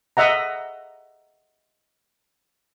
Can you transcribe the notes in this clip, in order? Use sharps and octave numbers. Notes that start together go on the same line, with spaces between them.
D#5 E5 F#5 A#5